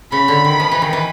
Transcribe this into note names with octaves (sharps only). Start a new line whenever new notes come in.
C#3 B5
D3
D#3
F3
E3
D#3
E3